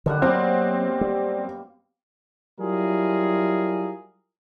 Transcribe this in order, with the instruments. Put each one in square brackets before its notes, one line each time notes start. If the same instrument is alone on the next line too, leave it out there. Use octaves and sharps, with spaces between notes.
[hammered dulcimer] F#2 G3 F#5 [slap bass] D3 D#3
[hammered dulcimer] B2 A#3 D#5 [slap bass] F#3 [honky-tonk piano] C4
[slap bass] G3
[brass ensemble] F#3 G3 E4 F4 G#4 A#4